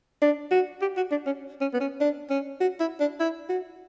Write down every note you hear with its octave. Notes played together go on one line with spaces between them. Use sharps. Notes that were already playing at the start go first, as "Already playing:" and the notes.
D4
F#4
G4
F#4
D4
C#4
C#4
B3
C#4
D4
C#4
F#4
E4
D4
E4
F#4